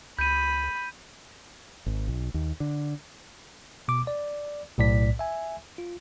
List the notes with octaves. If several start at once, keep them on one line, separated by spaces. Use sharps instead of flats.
C#2 B5 G6 D#7
G#1
B1
D#2
D3
B2 D6
D5
B1 A2 D5 B6
E5 G#5
F4